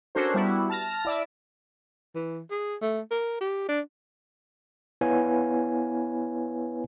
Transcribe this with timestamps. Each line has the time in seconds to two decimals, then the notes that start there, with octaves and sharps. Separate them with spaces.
0.15 C#4 D4 F#4 A4 A#4 C5
0.34 G3 B3 E4 F#4
0.70 A5 F6 A#6
1.05 E4 D5 E5
2.15 E3
2.51 G#4
2.82 A3
3.11 A#4
3.41 G4
3.69 D4
5.01 B3 E4 B4 C#5 F5 G#5